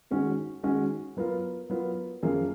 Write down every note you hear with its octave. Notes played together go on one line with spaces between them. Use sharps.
D#3 G#3 C#4 F#4
D#3 G#3 C#4 F#4
F#3 B3 F4 A#4
F#3 B3 F4 A#4
F#2 F3 A#3 F4 G#4